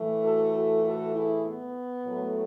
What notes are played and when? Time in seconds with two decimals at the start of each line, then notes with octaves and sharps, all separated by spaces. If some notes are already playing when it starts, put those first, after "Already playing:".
Already playing: A2 E3 A3
0.22 F#4 A4
0.54 F#4 A4
0.84 F#4 A4
1.14 E4 G#4
1.45 B3
2.06 A2 F#3 A3